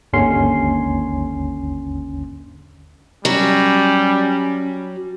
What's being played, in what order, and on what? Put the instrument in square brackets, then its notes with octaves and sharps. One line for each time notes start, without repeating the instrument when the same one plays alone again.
[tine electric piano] G#1 D#2 D3 C#4 C6 C7
[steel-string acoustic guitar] F#3 [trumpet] G3 [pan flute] C#4